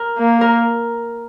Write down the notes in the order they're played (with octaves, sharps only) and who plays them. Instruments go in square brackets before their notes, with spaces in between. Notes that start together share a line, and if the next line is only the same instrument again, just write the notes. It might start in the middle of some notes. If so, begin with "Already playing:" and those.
Already playing: [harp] A#4
[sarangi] A#3
[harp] A#4